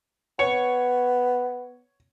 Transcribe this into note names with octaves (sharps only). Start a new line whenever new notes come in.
B3 C#5